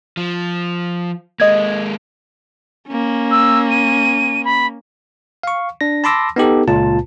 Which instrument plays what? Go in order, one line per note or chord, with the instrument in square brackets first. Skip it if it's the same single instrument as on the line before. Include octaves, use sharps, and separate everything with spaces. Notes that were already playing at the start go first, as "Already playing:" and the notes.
[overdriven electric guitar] F3
[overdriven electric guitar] G#3 A#3 [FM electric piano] D#5 G#6
[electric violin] A#3 C#4
[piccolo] E6
D#7
B5
[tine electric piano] F5 C#6
D4 A#6
A5 B5 C6 D6 E6 A#6
B3 D#4 G4 A4
C#2 A#2 F4 A5